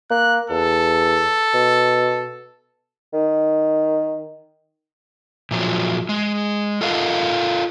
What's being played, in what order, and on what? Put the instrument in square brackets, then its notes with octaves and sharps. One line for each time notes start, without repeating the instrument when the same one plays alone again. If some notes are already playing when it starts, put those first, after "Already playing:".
[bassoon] A#3 [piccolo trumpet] F#6
[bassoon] E2 [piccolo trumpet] A4
[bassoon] B2
D#3
[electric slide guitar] A#2 F3 F#3
G#3
F4 A4 A#4 D#5 F5 F#5